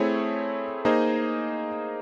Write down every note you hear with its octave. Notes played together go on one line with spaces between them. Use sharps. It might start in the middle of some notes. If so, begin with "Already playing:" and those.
Already playing: A3 C4 E4 G#4 C#5
A#3 D#4 G#4 C5 D#5